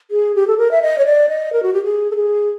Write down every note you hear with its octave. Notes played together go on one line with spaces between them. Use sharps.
G#4
G4
A4
A#4
E5
D#5
C#5
D5
D#5
A#4
F#4
G4
G#4
A4
G#4